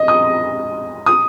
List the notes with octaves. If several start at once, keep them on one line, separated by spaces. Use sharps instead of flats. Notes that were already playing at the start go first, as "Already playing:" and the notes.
Already playing: D#5
D#6
D#6